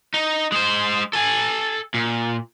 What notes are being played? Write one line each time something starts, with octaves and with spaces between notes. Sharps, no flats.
D#4
G#3 C5
A4 G#5
A#2